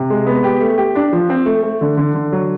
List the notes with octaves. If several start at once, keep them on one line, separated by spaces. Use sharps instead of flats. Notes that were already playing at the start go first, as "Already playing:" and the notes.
Already playing: C3
G#3
B3
G4
A3
G4
D4
F3
C4
A3
A3
D3
D3
D3
F#3